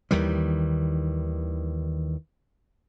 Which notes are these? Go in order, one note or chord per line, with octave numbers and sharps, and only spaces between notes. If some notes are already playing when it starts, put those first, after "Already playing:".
D#2 D#3 E3 G3